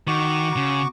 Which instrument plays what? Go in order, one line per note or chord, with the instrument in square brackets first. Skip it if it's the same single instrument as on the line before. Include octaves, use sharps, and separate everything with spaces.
[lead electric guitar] D#3 [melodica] F#4 C#6 D6
[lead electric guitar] C#3